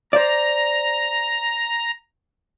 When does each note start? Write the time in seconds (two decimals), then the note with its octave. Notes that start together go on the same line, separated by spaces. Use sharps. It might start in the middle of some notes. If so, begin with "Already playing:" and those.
0.13 C5 D5 A#5